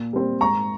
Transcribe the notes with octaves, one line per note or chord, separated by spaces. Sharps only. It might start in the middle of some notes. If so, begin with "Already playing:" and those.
Already playing: A#2
G3 C4
G#2 A#5 C#6